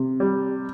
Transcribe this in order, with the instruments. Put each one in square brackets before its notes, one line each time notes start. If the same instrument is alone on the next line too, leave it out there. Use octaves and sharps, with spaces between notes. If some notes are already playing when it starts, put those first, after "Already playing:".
Already playing: [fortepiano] C3
G3